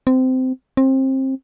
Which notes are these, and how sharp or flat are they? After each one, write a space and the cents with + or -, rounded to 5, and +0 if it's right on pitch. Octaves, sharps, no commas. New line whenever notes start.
C4 -20
C4 +25